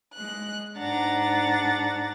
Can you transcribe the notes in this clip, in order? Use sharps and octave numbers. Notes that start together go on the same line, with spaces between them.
G#3 F#6
G#2 D4 F#5 A#5 A6